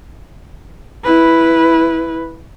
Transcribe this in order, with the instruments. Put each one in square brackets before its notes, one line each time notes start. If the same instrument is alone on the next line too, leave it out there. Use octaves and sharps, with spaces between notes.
[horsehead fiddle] E4 B4